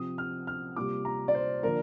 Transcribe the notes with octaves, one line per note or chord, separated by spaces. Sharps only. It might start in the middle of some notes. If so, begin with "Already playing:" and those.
Already playing: C3 F3 C4 D#6
F6
F6
C3 G3 A#3 F4 D6
A#5
D5
C5
D3 F3 A#3 D4 A#4